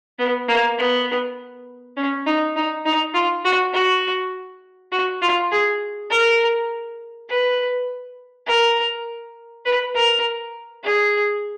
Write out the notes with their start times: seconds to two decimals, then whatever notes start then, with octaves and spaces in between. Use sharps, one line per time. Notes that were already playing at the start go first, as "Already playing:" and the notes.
0.19 B3
0.48 A#3
0.78 B3
1.96 C#4
2.26 D#4
2.56 D#4
2.85 D#4
3.14 F4
3.44 F#4
3.73 F#4
4.92 F#4
5.21 F4
5.51 G#4
6.10 A#4
7.28 B4
8.46 A#4
9.65 B4
9.94 A#4
10.84 G#4